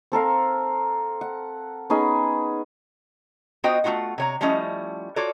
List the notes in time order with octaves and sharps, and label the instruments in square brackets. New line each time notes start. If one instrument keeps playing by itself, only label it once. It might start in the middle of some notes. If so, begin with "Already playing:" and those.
[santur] C4 A4 A#4 F5
F#5
B3 C#4 D#4 G#4
[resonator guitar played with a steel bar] B3 F4 F#4 C5 D#5 G5
A3 C4 F4 F#4 F#5
C3 C#5 A#5
F3 G3 A3 C#4 E4 D#5
F4 F#4 A4 C#5 D5